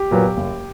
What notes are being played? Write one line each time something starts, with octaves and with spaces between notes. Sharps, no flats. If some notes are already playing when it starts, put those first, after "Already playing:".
Already playing: G4
A#2 F#3 B3
F#1